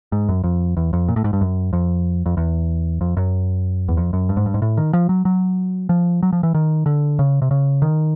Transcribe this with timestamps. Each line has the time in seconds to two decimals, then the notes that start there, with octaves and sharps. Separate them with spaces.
0.12 G#2
0.29 F#2
0.44 F2
0.77 E2
0.93 F2
1.08 A#2
1.16 A2
1.24 G#2
1.33 G2
1.41 F#2
1.73 F2
2.26 F2
2.37 E2
3.01 F2
3.17 F#2
3.88 E2
3.97 F2
4.13 F#2
4.29 G2
4.37 G#2
4.46 G2
4.54 G#2
4.62 A2
4.77 D#3
4.93 F3
5.09 F#3
5.25 F#3
5.89 F3
6.23 F#3
6.33 F3
6.43 E3
6.55 D#3
6.86 D3
7.19 C#3
7.42 C3
7.51 C#3
7.82 D#3